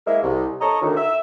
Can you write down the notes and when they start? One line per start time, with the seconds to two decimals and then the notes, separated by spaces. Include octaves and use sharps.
0.07 G#3 A#3 E4 A#4 E5
0.23 C2
0.61 A4 C#5 D#5 A#5
0.82 D2 D#3
0.97 E5